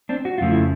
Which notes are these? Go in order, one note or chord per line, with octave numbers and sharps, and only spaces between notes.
C4 D4
F#4
F2 C#3 F3 A3 F4
E4